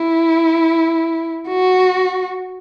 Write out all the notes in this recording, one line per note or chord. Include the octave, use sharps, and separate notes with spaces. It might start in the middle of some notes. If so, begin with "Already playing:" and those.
Already playing: E4
F#4